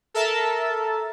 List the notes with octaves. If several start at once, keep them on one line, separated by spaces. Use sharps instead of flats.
A4 A#4 E5 A5